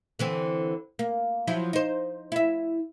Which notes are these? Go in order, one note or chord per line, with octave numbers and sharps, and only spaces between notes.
D3 E3 C4
A#3
F3 F#3 E4
D#4 C5
E4 E5